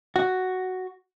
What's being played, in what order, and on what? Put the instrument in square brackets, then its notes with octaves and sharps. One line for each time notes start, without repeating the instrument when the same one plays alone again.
[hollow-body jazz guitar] F#4